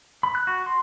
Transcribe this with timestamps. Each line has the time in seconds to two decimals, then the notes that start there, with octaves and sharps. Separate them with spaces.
0.23 B5
0.35 F#6
0.47 F#4
0.66 C6